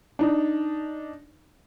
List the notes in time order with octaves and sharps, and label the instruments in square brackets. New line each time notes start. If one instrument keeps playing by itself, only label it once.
[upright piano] D4 D#4